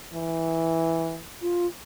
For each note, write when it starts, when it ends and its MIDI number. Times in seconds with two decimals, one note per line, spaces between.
0.14 1.19 52
1.42 1.67 65